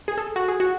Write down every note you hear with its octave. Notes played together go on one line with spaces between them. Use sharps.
G#4
A4
F#4
G#4
F#4